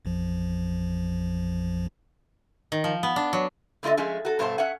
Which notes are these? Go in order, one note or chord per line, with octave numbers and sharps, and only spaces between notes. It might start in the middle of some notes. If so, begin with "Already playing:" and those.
A1 F2 F3
D#3
F3
B3
D4
F#3
D3 A3 F4 D#5 E5
F3 G#3 A3 C#4
F#4 A4
G2 B2 A3 C5 A5
C#4 E5 F#5